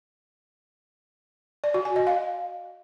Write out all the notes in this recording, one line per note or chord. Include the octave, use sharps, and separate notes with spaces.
D5
F#4
G#5
D#5
F5